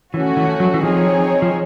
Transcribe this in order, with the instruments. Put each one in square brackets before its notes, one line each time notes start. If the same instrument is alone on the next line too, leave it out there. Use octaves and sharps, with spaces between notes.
[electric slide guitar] E3 [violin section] A3 C#4 F#4
[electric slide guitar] E3
F#3
E3
[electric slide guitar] F3 [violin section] C4 D#4 G#4 C#5
[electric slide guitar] F3